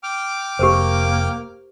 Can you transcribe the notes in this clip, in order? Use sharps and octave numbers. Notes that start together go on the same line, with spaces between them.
G5 D6 F6
F1 A#3 G4 A#4 C5